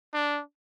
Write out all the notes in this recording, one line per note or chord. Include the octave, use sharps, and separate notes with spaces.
D4